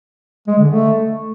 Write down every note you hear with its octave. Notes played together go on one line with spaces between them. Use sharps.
G#3
D3
A3